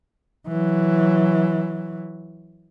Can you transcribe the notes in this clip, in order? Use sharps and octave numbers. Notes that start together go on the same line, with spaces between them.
E3 F#3